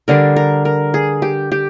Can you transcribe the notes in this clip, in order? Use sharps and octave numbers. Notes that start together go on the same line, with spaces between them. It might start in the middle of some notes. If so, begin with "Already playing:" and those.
D3 G3 D4 A#4
A#4
A#4
G#4
G4
G4